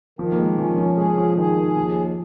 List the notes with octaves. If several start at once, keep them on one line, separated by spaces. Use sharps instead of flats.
D#3 F3
A#3
G#3
F3 C#4
F3
G#3 G#4
F3
D#3 G#4
D#3
D#2 F3